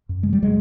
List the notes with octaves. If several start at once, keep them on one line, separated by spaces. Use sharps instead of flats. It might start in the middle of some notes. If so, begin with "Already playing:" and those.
F#2
C#3 G#3
G3
F#3 G#3